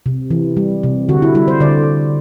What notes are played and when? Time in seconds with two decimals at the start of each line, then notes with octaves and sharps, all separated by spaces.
0.06 C3
0.31 E3
0.57 G3
0.83 C3
1.09 D3 F#4
1.22 E4
1.35 G3 E4
1.48 C5
1.60 D3 D5